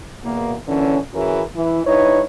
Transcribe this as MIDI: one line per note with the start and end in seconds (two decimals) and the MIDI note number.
0.23 0.54 40
0.23 0.54 47
0.23 0.54 58
0.68 0.97 46
0.68 0.97 50
0.68 0.97 52
0.68 0.97 61
1.14 1.42 52
1.14 1.42 61
1.14 1.42 64
1.14 1.42 66
1.14 1.42 68
1.14 1.42 70
1.55 1.83 52
1.85 2.22 43
1.85 2.22 63
1.85 2.22 64
1.85 2.22 71
1.85 2.22 73